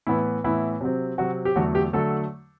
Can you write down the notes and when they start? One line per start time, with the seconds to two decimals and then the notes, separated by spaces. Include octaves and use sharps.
0.07 A2 E3 B3 E4
0.44 A2 E3 B3 E4
0.81 C3 F#3 C4
1.18 C3 F#3 C4 F#4
1.45 G4
1.56 E2 D3 F#3 A3 F#4
1.75 G4
1.93 D3 F#3 A3 A4